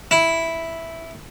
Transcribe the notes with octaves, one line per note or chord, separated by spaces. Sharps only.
E4